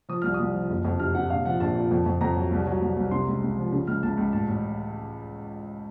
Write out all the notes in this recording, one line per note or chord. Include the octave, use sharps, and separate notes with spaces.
F3 D#6
C2 F6
D#6
C2
F3
F#1
F2
C3 F6
C3 F#5
A#1 F5
F3 F#5
A#1 A5
A#2
F2
F2
F2 A#5
F#3
C2
F#3
C2
C2
C3 C6
C#2
C#2
F3
C#3
C#2 F6
C#2 A5
C#2
A1 A5
A1